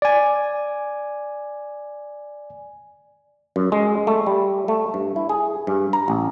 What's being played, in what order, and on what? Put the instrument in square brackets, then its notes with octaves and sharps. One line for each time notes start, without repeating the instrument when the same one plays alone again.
[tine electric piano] D5 G#5
[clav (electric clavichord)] F#2
G#3
A3
G3
A3
G2
E4
G#4
G2
A#5
A1